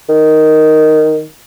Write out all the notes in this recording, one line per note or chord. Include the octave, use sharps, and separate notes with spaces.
D#3